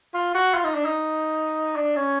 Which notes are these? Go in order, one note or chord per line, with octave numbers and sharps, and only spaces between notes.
F4
F#4
F4
D#4
D4
D#4
D4
C#4